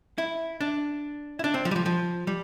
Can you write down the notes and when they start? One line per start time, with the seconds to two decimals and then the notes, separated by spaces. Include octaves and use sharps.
0.18 E4
0.61 D4
1.39 E4
1.44 D4
1.54 C4
1.65 F3
1.71 G3
1.76 F3
1.86 F3
2.27 G3